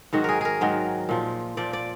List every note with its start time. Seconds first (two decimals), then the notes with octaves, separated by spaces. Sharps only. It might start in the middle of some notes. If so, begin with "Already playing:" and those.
0.13 G#2 D#3 F#3 F#4
0.24 G#4 A#4
0.41 G#4 A#4
0.61 G#2 D#3 F#3
1.09 A#2 F3
1.57 A#2 F3 D5
1.73 D5